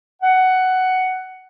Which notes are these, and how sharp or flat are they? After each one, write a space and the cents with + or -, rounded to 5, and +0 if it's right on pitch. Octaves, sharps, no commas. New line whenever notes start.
F#5 +10